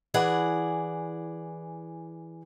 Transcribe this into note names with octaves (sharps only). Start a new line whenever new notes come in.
E3 G#4 D5 F#5